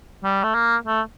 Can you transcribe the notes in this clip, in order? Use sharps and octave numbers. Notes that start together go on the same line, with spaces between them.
G3
A3
A#3
A3